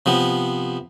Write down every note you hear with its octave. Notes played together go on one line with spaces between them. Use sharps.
C3 F3 B3